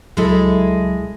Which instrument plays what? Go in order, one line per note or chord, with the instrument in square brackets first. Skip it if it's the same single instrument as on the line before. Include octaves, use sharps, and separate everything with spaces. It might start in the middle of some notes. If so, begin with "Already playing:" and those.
[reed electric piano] C#2 F#3 [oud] G#3 E4 A4